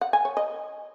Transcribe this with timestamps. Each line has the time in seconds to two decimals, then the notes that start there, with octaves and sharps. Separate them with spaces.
0.01 F#5
0.13 G#5
0.25 C#5
0.37 D#5